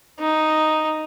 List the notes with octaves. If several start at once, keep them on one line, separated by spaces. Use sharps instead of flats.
D#4